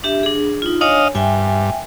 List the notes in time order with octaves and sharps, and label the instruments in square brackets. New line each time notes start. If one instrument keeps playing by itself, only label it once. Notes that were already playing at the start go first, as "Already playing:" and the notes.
[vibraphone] D4 G4 E5
D4 G#4
D#4 F4
[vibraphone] D4 C#5 G#5 [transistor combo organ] D#5 F5
[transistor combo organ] G2 [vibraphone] E5 G5 G#5